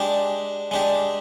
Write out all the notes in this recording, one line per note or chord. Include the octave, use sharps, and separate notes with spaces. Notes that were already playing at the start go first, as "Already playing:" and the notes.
Already playing: G#3 D4 G4
G#3 D4 G4